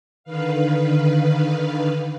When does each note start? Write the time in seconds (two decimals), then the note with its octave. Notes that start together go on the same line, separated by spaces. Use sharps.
0.24 D3 D#3 B4 F5